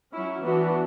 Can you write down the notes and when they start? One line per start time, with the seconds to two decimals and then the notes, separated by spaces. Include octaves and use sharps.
0.13 F#3 C#4 E4
0.44 E3 B3 D4 F#4